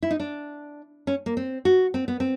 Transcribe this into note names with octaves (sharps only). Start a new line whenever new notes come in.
E4
D#4
D4
C#4
A#3
C4
F#4
C4
B3
C4